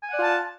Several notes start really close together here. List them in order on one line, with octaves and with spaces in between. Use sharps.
G#5 F#5 D5 F4 A5